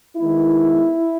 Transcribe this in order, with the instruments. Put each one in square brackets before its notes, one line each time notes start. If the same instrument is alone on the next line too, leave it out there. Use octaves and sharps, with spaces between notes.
[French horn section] D#3 G#3 B3 E4